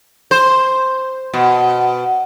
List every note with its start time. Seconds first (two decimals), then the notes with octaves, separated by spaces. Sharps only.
0.31 C5
1.34 B2